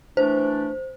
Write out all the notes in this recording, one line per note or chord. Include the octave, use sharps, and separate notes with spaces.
E3 A3 D4 C5